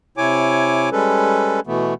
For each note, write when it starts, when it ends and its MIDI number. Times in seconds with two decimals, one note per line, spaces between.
0.17 0.90 48
0.17 0.90 64
0.17 0.90 73
0.17 0.90 80
0.17 0.90 86
0.92 1.60 55
0.92 1.60 56
0.92 1.60 61
0.92 1.60 69
0.92 1.60 71
1.67 1.94 47
1.67 1.94 52
1.67 1.94 57
1.67 1.94 59